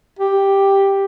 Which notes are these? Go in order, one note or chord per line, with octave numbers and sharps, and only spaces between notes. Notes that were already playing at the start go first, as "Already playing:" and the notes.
G4